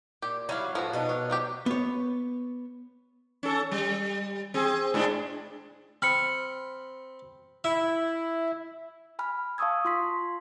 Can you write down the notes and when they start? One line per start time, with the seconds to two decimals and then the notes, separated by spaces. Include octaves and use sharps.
0.22 A#2 G4
0.49 F#3 G3 E4 F5
0.75 A2 F3 B3 F#4
0.93 B2 D4 D#4
1.09 C#5
1.30 F3 F#3 G4
1.66 B3 C#5
3.43 C#4 A4
3.71 G3
4.54 C4 G#4
4.94 G#2 G#3 D4
6.02 C4 B5 F6 C#7
7.64 E4 E5
9.19 G#5 B5 F6
9.58 F5 A5 C#6 D#6 E6 G#6
9.85 F4 C6 B6